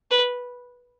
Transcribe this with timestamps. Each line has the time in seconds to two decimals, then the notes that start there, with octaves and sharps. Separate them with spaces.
0.11 B4